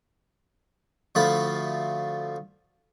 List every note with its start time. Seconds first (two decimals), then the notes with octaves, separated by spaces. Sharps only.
1.15 D2 F3 A3 F4 B5